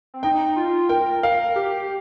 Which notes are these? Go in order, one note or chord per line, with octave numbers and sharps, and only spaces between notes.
C4
D#4 G5
F4
A#4 G5
A#4 F5
G4